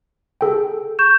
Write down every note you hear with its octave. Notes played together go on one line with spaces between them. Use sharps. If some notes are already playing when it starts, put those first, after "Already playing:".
G#4 A4 G5
C#6 G6 E7